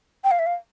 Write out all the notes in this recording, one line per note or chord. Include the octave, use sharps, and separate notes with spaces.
G5
F5
E5
F5